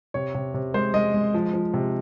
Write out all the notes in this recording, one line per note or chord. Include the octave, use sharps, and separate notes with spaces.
C3 C#5
C3
C3
G#3 C5
G#3 D#5
G#3
F3
F3
C3